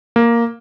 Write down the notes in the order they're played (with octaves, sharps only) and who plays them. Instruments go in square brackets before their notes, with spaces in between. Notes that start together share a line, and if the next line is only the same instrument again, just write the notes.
[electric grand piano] A#3